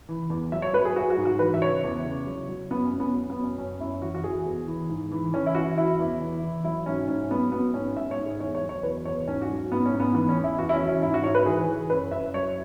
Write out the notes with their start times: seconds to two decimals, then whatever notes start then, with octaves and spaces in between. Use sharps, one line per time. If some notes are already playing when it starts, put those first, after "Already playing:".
0.09 E3
0.30 E2
0.52 F#3 E5
0.62 C#5
0.73 F#3 B4
0.85 G#4
0.96 F#3 F#4
1.10 F#4
1.17 G#2
1.25 F#4
1.39 E3 B4
1.54 E5
1.61 C#3 C#5
1.84 E2
2.05 C#3
2.27 F#3
2.49 F#3
2.70 F#2 B3
2.85 C#4
2.93 F#2
3.00 B3
3.14 F#3
3.30 B3
3.36 F#2
3.44 C#4
3.58 F#2 C#4
3.80 F#2 E4
4.01 E3 F#4
4.15 F#4
4.24 E3 G#4
4.46 E2
4.67 E3
4.90 G#2
5.11 E3
5.33 E3 C#4
5.46 E4
5.55 E3 F#4
5.77 E3 E4
5.99 E2
6.21 E3
6.42 E3
6.64 F#3 E4
6.86 G#2 C#4
7.08 G#2 C#4
7.30 F#3 B3
7.52 F#3 B3
7.74 G#2 C#4
7.96 G#2 E5
8.11 C#5
8.18 G#2
8.26 G#4
8.40 E2 C#5
8.55 C#5
8.62 F#3
8.69 C#5
8.83 E2 B4
9.05 E2 C#5
9.27 G#2 C#4
9.42 F#4
9.50 F#3
9.71 G#2 B3
9.86 C#4
9.94 G#2
10.00 B3
10.14 E3 B3
10.29 C#4
10.37 E2
10.44 E4
10.59 E2 F#4
10.69 E4
10.73 C#4
10.81 E3
10.88 C#4
11.02 G#2 E4
11.14 F#4
11.24 G#2 C#5
11.35 B4
11.46 E3 G#4
11.67 E3
11.90 F#2 B4
12.11 F#2 E5
12.34 F#3 C#5